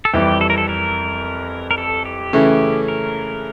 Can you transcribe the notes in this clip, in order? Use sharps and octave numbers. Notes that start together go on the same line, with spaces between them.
A4
F2 E3 G3 G4
A4
A#4
A4
A#4
A#4
A4
G4
C#3 E3 A3 C#4
A#4